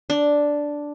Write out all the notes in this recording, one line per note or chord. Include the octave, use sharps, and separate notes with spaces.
D4